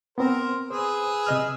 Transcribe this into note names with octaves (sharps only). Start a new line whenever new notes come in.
B3 C4 A#4 C5
G#4 B4 C5 E6
C3 D#5 F6